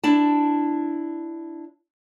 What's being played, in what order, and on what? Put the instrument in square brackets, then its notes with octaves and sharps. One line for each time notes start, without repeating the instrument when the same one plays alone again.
[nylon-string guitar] D4 E4 A5